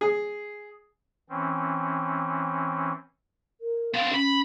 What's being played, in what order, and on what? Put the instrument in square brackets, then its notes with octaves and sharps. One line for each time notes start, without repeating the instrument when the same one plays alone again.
[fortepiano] G#4
[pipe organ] E3 C4 C#4
[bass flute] A#4
[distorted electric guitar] B3 C4 [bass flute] F5
[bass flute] C#4 [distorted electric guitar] B5